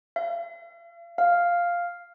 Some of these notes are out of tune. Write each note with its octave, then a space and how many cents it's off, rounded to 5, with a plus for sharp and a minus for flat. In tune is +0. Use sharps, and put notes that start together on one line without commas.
F5 -45
F5 +0